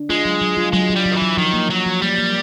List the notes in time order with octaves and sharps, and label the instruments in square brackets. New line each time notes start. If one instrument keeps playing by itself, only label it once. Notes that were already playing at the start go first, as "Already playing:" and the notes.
Already playing: [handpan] D4
[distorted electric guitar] G#3 [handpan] F4
[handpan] F#3
F#3
F4
[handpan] F#3 [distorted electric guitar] G#3
[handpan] F#3
[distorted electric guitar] G3
[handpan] F#3
[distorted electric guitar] D#3
E3
[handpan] F#3
[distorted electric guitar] D#3 [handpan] F3
[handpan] A#3
[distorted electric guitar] F#3 [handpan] A#3
[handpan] F3
[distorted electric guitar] G3 [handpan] A#3
[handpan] A#3